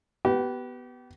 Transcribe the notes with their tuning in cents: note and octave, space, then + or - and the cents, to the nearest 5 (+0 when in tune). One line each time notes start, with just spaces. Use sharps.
B3 +0 G4 -30